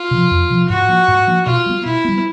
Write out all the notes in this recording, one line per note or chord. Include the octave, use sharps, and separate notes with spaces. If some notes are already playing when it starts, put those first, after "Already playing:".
Already playing: F4
C3 F3
F2
C3 F3
G#2 F#4
F3 A#3 D4
G#2
F3 A#3 D4
B2 F4
G3 B3
B2 E4
G3 B3